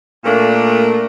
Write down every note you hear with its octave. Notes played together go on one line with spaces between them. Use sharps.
A#2 A3 A#3 D4 A#4